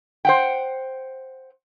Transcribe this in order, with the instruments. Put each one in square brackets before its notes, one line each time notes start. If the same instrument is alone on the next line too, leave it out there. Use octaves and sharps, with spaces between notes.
[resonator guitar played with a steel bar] C5 F#5 G5